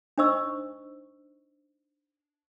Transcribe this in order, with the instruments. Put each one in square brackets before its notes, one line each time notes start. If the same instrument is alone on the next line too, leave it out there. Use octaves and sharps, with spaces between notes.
[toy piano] D4 D#4 C5 D#5 C#6 E6